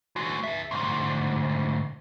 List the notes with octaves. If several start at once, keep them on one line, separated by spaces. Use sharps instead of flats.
G#3 F#4
G#4 E5
D2 G#2